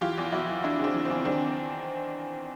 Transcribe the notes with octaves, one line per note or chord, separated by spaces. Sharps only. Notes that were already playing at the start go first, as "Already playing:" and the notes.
E3 F4 G4
E2
E2 E4 F#4
E3
E3 D4 E4
C#3 C4 D4
E3
E2 C4
D#3 C4 D4